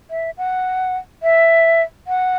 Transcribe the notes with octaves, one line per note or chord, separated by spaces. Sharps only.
E5
F#5
E5
F#5